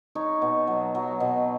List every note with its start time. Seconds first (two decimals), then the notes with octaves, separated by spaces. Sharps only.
0.15 D#4 C#5
0.42 B2
0.67 F#3
0.95 F#3
1.20 B2